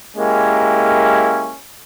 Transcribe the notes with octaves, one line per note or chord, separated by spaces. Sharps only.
G#3 A#3 C#4 E4 G4 A#4